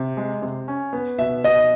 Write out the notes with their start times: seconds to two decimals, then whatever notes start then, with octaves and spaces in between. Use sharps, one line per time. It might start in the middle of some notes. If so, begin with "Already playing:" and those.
Already playing: C3
0.17 G#3
0.42 C3
0.68 C#4
0.93 B3
1.18 B2 E5
1.44 B2 D#5